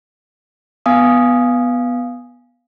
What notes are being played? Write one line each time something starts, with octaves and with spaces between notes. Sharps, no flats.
B3 F5 G#5 D#6